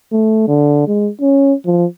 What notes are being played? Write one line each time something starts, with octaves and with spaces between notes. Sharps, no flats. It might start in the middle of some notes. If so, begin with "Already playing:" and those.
A3
D3
G#3
C#4
F3